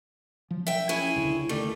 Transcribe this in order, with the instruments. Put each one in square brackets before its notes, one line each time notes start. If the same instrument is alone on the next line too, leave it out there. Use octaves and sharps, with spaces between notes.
[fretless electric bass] F3 F#3
[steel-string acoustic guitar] E5 G5
C#4 E4 G#4
[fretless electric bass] E1 C#2 D3
[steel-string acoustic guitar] D#3 G3 A3